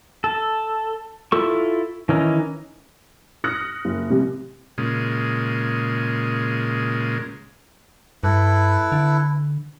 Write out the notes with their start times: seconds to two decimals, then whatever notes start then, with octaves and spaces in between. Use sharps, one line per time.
0.24 A4
1.32 E4 F4 A4 C#6
2.09 D#3 E3 C#4 D#4
3.44 D#6 F6 F#6 A#6 C#7
3.85 F#1
4.10 A1 C3
4.78 A#2 C#3 G#3
8.23 G2 E4 A4 B4
8.92 D3